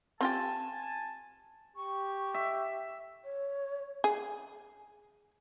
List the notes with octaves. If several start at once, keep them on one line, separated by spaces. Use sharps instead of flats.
C4 F4 G4 G#5 A5
G4 C#6
E5
C#5
G#4